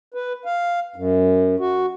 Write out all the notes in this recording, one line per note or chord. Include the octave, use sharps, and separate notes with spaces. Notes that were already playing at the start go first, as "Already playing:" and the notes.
B4
F5
F#2
F#4